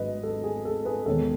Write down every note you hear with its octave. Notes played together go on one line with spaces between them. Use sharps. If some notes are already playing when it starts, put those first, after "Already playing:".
Already playing: G#1 G#2 F#3 B4 D#5
A4
G#4
A4
G#4 B4
E1 D#2 D#3 G#3 A4 C#5